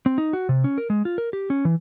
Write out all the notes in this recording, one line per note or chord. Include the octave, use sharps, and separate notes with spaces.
C4
D#4
F#4
C3
C#4
A#4
G#3
F4
A#4
G4
C#4
E3